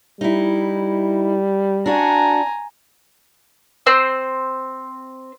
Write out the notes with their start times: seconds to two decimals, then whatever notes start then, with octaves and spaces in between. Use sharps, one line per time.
0.21 G3 D#4 E4
1.86 D4 F#4 G#5 A#5
3.86 C4 C5 E6